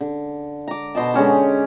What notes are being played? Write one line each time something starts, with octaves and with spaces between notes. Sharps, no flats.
D3
A#5 D6
B2 C5 D#5 A5
D3 G#3 C#4 G4